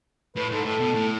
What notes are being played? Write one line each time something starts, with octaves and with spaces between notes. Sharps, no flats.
A2 B4
G#2 A4
A2 A4
B2
A2